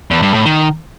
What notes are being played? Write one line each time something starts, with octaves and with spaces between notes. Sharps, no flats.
E2
G2
A2
D#3